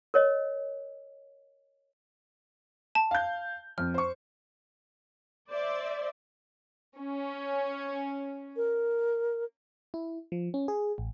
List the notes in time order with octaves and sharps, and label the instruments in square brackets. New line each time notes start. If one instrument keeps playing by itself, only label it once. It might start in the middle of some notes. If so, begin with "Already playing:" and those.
[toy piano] A#4 C#5 D#5
[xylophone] A5
[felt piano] F5 G6
[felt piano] F2 [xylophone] F6
[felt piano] C5 C#6
[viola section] C5 D5 E5
[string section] C#4
[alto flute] A#4
[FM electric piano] E4
F3
C#4
G#4
A1